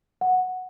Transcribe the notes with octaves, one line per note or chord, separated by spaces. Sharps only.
F#5